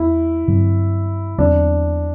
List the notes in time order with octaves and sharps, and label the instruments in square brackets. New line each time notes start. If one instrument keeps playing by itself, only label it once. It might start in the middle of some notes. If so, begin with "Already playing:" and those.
Already playing: [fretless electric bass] E2 A3 [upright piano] E4
[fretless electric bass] G2 D3 F#3 C4
[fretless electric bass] E2 D3 F#3 C4 [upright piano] D4